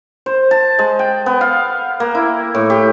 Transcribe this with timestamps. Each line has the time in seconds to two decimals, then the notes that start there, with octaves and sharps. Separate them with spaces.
0.26 C5
0.51 A5
0.79 G#3
0.99 G5
1.26 B3
1.41 F5
2.00 A#3
2.15 E4
2.55 A2
2.70 G4